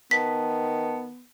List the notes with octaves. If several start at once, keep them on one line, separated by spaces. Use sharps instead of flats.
D#3 B3 A5 B6